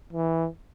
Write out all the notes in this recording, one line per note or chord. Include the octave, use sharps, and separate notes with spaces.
E3